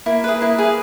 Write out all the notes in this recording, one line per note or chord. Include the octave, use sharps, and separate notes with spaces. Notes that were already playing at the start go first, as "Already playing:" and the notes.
A#3 E4
G#4 B4
A#3 E4
G#4 B4